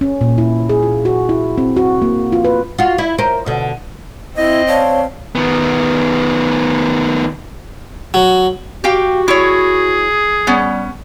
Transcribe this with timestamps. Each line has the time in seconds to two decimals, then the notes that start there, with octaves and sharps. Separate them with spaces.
0.01 C#4
0.21 A#2
0.38 E4
0.69 G#4
0.83 F4
1.05 F#4
1.29 E4
1.58 C4
1.76 F#4
2.02 A#3
2.32 F4
2.44 B4
2.79 F4 F#4
2.98 E4
3.18 A#4 C5
3.46 B2 D3
4.37 C4 E4 D#5
4.67 C#5 D5 F5 A5
5.35 D#3 B3
8.14 F#3
8.84 F#4 G4 F5 G5
9.28 E4 G#4 C#5
10.47 G3 B3 C#4